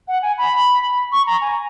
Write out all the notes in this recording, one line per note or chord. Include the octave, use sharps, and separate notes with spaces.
F#5
G#5
B5
C#6
A#5
G#5